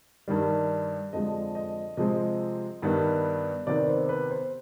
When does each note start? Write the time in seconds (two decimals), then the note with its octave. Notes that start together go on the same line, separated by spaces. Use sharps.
0.28 G2 D#3 G3
1.13 F2 D3 F3 G#3 D#5
1.55 D#5
1.97 C3 F3 G#3 C4 D#5
2.82 G2 D#3 G3 B3
3.67 C3 D#3 B3 D5
3.88 C5
4.09 B4
4.31 C5